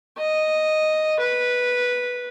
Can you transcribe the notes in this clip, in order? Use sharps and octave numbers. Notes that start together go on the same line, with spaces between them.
D#5
B4